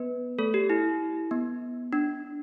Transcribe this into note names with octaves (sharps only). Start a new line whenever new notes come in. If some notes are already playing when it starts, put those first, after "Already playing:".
Already playing: B3 B4
A3 A4
G4
E4
B3
D4